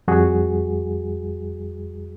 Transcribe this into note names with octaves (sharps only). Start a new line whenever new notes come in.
F2 G3 F#4 G#4